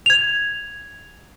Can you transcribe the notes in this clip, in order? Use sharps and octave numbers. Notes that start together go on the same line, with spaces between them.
G#6 F7